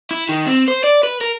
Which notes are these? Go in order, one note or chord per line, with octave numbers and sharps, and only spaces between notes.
E4
D#3
C4
C5
D5
B4
A#4